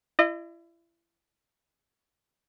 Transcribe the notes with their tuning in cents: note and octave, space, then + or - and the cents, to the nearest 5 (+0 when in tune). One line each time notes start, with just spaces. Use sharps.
E4 +35 D#5 -30